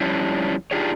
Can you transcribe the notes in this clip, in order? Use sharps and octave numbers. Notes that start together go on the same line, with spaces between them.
F3 G3 C#4 D4 E4
D4 D#4 F4 G4 G#4 C#5